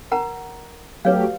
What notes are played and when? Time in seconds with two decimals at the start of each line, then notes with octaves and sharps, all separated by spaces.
0.11 A#4 F#5 A#5
1.05 F#3 A3 G4 B4 C#5 F5